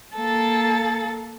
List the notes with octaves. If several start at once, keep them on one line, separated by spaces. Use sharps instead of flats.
A#3 A4 A6